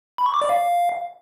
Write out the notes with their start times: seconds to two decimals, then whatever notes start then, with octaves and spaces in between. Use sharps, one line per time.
0.18 B5
0.26 C#6
0.34 D6
0.42 D5
0.49 F5